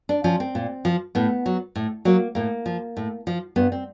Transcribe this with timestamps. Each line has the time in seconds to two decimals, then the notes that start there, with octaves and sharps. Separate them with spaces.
0.09 D4
0.24 F3 C#4
0.40 C4
0.55 A#2
0.85 F3
1.15 A2 B3
1.46 F#3
1.76 A2
2.05 F#3 A#3
2.35 A2 A#3
2.66 F3
2.97 A2
3.27 F3
3.56 G2 B3
3.72 C4